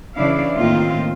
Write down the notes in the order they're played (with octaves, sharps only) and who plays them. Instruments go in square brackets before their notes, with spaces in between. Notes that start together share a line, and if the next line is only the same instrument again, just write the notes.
[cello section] C#3 E3 D4 E4 D5 F5
A2 D#3 A#3 C4 F4